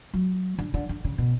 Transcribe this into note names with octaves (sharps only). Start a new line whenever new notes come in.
F#3
D3
D3
D3
C#3
B2